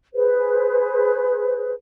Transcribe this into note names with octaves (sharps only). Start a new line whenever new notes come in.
G#4 B4 C5